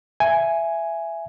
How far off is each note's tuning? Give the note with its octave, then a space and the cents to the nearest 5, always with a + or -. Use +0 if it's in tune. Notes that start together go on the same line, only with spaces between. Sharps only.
E5 +15 G#5 +0